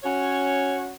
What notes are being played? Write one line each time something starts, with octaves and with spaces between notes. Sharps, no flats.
C#4 F#4 C#5